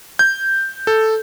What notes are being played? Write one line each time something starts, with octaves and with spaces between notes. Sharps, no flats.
G6
A4